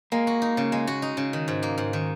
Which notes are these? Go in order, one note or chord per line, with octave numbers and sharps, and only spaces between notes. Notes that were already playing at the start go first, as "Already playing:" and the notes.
G#3 A#3
F#4
D#4
C#3
G#3
F#4
D#4
C#3
D#3
G#2
A#3
G#2
D#3